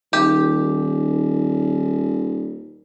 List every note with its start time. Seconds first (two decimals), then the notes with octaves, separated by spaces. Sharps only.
0.13 D#1 D#3 G4